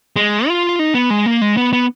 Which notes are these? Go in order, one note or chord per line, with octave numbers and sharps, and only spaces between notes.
G#3
F4
D#4
B3
G#3
A#3
G#3
B3
B3